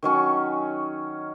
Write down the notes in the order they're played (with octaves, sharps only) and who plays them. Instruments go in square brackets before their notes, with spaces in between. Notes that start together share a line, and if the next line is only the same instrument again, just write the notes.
[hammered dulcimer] D#3 F#3 C#4 C#6